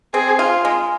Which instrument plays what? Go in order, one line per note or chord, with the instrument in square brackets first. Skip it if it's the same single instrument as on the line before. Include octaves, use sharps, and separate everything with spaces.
[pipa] C4 [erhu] G#4
[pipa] F4
G#3